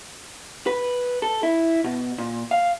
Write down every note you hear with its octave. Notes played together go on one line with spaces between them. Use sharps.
B4
A4
E4
B2
A#2
F5